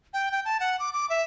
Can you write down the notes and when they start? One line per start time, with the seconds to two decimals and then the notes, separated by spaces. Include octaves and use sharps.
0.14 G5
0.32 G5
0.45 A5
0.60 F#5
0.79 D6
0.93 D6
1.10 E5